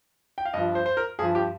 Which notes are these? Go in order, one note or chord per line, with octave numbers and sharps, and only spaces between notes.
G5
F5
G2 F3 D#5
C5
C5
A#4
G2 F3 G#4
G4